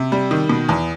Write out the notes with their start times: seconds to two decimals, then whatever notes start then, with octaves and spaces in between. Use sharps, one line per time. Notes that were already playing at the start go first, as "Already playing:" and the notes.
Already playing: C3
0.12 G3
0.31 D#3
0.49 B2
0.69 E2